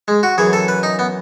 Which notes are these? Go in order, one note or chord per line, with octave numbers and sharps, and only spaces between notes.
G#3
F#4
F#2 E3 G#4
A4
B4
D#4
B3